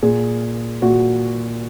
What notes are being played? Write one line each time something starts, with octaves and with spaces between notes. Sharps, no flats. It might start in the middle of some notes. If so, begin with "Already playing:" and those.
A#2 G#4
A#2 F#4